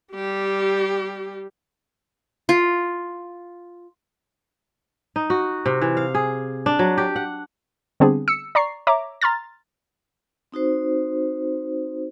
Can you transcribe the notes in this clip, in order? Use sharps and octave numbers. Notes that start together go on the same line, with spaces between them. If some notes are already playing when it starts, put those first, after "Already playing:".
G3 G4
F4
D#4
F#4
C3
E3
F5
G#4
D4
F#3
G4
F#5
D3 G3 B3 C4 D4 G#4
E6 C#7
D5 A#5 C#6 C7
C#5 E5 A#5 D6
A#5 C6 F6 A6
C4 D#4 F#4 C5